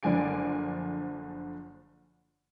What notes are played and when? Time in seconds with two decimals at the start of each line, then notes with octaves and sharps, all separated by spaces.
0.03 F#1 D3 F3 D5 G#5 D7